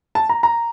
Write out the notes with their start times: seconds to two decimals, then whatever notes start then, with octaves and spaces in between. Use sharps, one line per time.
0.15 A5
0.29 A#5
0.43 A#5